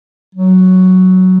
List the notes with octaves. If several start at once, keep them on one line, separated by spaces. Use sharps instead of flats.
F#3